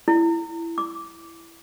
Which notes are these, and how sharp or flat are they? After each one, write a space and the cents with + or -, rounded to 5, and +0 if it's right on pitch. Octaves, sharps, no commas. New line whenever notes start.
E4 +15
D6 -15